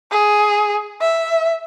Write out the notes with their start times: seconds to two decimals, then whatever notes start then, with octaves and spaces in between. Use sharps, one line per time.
0.11 G#4
1.01 E5